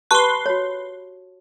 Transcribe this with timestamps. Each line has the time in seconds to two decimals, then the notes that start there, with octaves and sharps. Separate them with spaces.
0.11 G4 B4 A5 C6 C#6
0.46 F#4 C#5